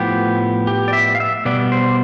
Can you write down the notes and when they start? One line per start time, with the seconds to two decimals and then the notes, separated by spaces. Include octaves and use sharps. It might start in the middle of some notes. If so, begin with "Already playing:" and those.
Already playing: A2 F3 B3 G4
0.67 G4
0.88 D5
0.93 E5
1.15 F5
1.20 E5
1.45 B2 G3 B3 D5
1.72 C5